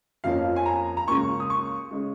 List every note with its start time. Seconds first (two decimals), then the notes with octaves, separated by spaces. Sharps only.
0.24 F2 F3 A#3 C#4 F5
0.56 G#5
0.66 A#5
0.97 A#5
1.08 C#2 C#3 A#3 C#6
1.40 D#6
1.50 C#6
1.91 C#3 G#3